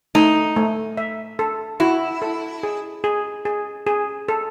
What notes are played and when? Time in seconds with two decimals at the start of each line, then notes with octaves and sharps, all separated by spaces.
0.15 A3 D#4
0.56 A3
0.97 E5
1.39 A4
1.80 E4 F#4
2.22 A4
2.63 G#4
3.04 G#4
3.45 G#4
3.87 G#4
4.29 A4